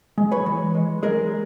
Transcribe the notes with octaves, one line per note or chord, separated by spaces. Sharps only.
G#3
B4 C#5
E3
G#3
G#3 G#4 A#4